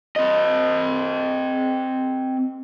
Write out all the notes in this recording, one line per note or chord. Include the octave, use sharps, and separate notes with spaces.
C4 D#5